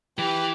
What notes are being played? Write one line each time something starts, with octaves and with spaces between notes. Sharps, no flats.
E3 G4